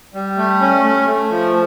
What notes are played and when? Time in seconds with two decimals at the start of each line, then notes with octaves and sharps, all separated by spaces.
0.14 G3
0.37 A3
0.61 C#4
0.84 A3
1.07 A3
1.30 F3